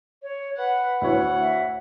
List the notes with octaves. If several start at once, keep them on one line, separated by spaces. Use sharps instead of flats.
C#5
B4 F#5
D2 E4 C#5 F#5
E5